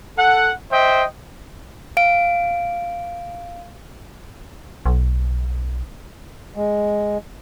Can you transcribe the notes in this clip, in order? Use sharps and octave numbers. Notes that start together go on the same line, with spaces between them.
A4 F#5
C5 D#5 E5 G5
F5 D7
B1
G#3